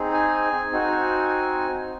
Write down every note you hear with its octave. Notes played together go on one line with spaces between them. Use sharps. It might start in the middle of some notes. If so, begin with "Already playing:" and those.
Already playing: C4 D#4 G#4
G#5
C4 D#4 F#4